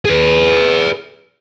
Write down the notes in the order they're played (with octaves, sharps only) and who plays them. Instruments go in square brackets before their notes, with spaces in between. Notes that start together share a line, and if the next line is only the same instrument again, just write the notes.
[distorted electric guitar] G#4 B4